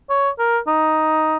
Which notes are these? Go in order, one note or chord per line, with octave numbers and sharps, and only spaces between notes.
C#5
A#4
D#4